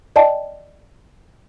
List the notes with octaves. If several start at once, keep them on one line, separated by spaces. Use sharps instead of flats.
D5 D#5 G5 A5